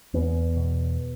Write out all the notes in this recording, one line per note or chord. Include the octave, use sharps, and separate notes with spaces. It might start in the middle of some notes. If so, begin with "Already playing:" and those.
E2 B3
B2